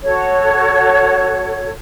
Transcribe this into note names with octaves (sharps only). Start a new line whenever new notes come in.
F#4 A4 C#5